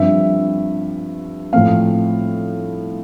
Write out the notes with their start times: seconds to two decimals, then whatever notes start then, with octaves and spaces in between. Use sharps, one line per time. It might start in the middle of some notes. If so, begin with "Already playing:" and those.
Already playing: G2 F3 C4 E5
1.53 A2 F3 A3 C4 F5